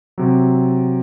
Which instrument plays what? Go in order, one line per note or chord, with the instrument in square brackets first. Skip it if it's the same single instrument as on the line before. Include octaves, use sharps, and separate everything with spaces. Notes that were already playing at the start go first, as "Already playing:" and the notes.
[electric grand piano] C3 F#3